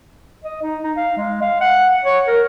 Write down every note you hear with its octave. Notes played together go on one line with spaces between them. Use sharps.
D#5
D#4
D#4
F5
G#3
F5
F#5
C#5
A#4